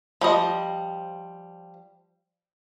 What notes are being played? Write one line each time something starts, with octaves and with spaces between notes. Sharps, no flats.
F3 G3 D#5